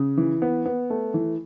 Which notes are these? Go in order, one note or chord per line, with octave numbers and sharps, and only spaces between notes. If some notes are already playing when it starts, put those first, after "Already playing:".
Already playing: C#3
E3
B3
B3
A3
E3